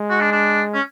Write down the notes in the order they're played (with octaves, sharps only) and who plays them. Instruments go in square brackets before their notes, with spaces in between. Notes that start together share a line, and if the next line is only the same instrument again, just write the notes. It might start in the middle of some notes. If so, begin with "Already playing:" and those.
Already playing: [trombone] G#3
[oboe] F#4
D4
D4
C#4